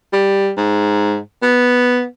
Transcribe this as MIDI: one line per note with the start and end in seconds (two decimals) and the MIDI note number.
0.13 0.52 55
0.57 1.19 44
1.42 2.05 59